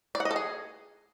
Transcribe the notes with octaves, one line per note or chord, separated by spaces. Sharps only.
D5
F#5
D#5
A4
G#4